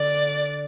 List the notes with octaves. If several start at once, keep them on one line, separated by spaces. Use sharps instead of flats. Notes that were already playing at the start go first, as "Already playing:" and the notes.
Already playing: D3 D4 D5